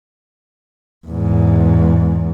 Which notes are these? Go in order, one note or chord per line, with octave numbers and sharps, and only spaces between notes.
E2 G#2